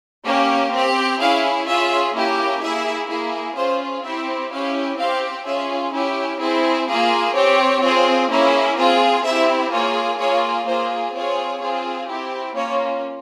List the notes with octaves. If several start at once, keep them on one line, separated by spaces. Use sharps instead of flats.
A#3 C#4 G4
C4 G4
C#4 E4 G#4 F5
C#4 F4 G#4 E5
A#3 C#4 E4 G4
A#3 E4 G#4 E5
A#3 E4 G#4
C#4 F4 G#4 C5
C4 E4 G4 E5
C#4 E4 G4 F5
C4 G4 F5
C#4 F4 G#4 E5
C#4 E4 G4
C4 E4 G#4
A#3 F4 G#4
C4 G4 C#5
C4 F4 G#4
A#3 C#4 E4 G#4
C4 F4 G#4
C4 E4 G4 E5
A#3 F4 G#4 C#5
A#3 F4 G#4 C#5
A#3 F4 G#4 C5
C4 F4 G#4 C#5
C4 F4 G#4
C4 E4 G4
A#3 C#4 F4 C#5